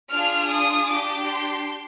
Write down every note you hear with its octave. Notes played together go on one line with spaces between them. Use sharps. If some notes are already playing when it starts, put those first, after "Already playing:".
D4 F4 G#4 F6
D#6
D4 G4 D6
C6